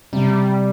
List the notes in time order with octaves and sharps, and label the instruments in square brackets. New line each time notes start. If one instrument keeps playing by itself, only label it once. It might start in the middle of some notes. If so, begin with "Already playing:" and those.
[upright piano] C3 [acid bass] G3